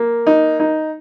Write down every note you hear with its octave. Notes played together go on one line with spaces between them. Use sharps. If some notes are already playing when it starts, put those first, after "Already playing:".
Already playing: A#3
D#4
D#4